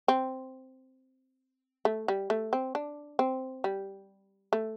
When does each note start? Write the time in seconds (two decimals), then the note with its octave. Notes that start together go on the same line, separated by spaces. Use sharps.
0.08 C4
1.85 A3
2.08 G3
2.30 A3
2.53 C4
2.75 D4
3.19 C4
3.64 G3
4.53 A3